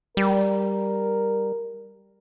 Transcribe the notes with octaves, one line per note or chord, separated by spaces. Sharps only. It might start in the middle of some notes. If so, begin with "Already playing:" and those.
G3 A#4